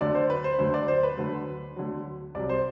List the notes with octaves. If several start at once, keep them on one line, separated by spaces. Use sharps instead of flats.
D2 D3 F#3 D5
C5
B4
C5
D2 D3 F#3 C5
D5
C5
B4
D2 D3 F#3
D2 D3 F#3
C2 C3 F#3 D5
C5